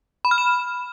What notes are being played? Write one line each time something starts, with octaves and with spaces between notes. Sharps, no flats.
B5
F6
E7